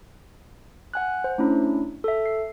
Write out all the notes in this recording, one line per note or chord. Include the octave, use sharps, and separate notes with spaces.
F#5 G#5 F#6
C5
A3 C#4 D4 E4
A4 E5
C7